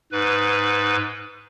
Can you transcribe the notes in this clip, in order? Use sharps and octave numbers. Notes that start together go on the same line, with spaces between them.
G#2 B4